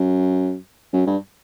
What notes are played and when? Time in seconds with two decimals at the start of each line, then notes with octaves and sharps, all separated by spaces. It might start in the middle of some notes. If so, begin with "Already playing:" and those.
Already playing: F#2
0.93 F#2
1.06 G2